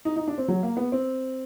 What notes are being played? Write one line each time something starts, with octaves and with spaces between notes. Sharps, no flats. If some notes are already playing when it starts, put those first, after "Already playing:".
D#4
D#4
D4
C4
F#3
A#3
B3
C4